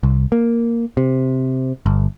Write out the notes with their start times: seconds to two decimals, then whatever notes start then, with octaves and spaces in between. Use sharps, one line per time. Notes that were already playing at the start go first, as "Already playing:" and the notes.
0.03 C2
0.32 A#3
0.97 C3
1.86 G1